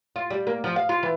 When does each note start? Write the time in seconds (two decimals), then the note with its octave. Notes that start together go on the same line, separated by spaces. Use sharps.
0.16 F4
0.30 G3
0.47 A#3
0.64 F3
0.76 F5
0.89 F4
1.03 E3